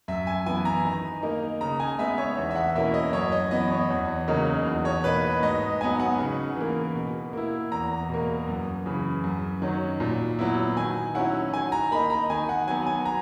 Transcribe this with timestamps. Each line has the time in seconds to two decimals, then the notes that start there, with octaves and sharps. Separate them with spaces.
0.08 F#2 E5
0.27 G#5
0.46 E3 B3 G#5
0.65 A#5
0.85 D#3
1.22 A#3 D#4
1.61 C#3 A#5
1.80 G#5
1.98 G#3 B3 D#4 E5
2.18 C#5
2.37 E2 E5
2.51 E5
2.56 F#5
2.75 B2 A#3 C#4 E4 E5
2.94 D#5
3.13 F#2 C#5
3.32 D#5
3.51 E3 B3 D#5
3.70 C#5
3.90 E2
4.28 C#3 F#3 A#3 D#4
4.66 E2
4.85 C#5
5.04 B2 A#3 D#4 B4
5.43 G#2 D#5
5.81 F#3 B3 D#4 G#5
6.00 F#5
6.18 C#3
6.56 E3 A#3
6.95 B2
7.33 A#3 E4
7.72 E2 A#5
8.09 B2 A#3
8.48 F#2
8.86 C#3 E3
9.24 F#2
9.62 D#3 F#3 C#4
10.00 A#2
10.39 F#3 B3 E4
10.76 D#3 G#5
11.15 F#3 C#4 E4 F#5
11.53 D#3 G#5
11.72 A#5
11.91 A#3 D#4 B5
12.10 A#5
12.30 D#3 G#5
12.49 F#5
12.67 F#3 B3 G#5
12.87 G#5
13.05 A#5